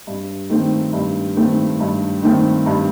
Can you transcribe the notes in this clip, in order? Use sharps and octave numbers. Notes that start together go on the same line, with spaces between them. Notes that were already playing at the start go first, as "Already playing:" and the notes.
G2
D#3 A3 C4
G2
D#3 A3 C4
G2
D#3 A3 C4
G2